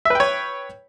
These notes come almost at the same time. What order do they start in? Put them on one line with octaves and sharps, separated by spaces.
E5 B4 G5 C#5